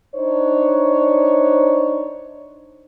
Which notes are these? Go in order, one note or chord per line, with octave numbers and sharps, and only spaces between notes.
D4 D#4 C5 C#5